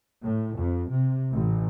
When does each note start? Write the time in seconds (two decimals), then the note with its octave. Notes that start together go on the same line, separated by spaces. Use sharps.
0.23 A2
0.57 F2
0.89 C3
1.33 A1